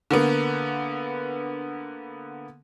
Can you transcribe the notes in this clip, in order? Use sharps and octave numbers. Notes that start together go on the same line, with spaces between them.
D3 A#3 B3